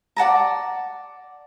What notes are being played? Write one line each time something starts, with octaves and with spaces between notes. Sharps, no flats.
D5 F#5 A5 A#5